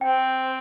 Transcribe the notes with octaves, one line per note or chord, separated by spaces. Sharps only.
C4 G5